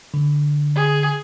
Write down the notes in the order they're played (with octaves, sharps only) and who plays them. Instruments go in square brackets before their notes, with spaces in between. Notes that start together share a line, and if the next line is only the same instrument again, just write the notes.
[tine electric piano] D3
[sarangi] G#4